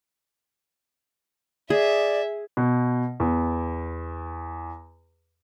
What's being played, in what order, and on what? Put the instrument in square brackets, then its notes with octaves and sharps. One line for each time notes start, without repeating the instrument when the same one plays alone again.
[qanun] G#4 [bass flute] D5 [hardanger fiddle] E5
[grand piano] B2
E2